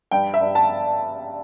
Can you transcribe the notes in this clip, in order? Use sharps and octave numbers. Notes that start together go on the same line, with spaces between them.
G2 G5
E5
G2
A5